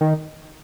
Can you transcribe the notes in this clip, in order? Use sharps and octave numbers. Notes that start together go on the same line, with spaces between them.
D#3